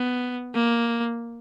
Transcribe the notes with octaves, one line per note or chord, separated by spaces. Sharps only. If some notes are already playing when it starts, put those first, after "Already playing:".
Already playing: B3
A#3